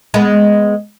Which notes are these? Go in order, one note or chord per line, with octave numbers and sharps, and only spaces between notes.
G#3 B3